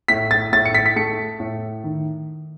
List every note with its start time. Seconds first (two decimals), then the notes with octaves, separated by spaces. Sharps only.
0.08 A2 B6
0.31 A6
0.52 A2 A6
0.66 C#7
0.74 B6
0.86 B6
0.96 A3 C#7
1.40 A2
1.84 D#3